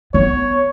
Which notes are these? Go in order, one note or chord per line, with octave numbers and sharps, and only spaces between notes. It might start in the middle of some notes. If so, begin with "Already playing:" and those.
B3 C#5